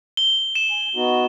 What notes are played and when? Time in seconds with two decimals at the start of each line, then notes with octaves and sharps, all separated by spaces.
0.17 G7
0.55 E7
0.71 G#5
0.96 B3 D#4 F#4